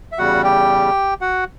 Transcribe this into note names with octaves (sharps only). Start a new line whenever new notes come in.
E5
E2 C#3 G3 F#4 F#5
G4 G5
F#4 F#5